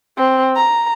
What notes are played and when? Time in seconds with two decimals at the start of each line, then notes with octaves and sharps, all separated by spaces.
0.18 C4
0.56 A#5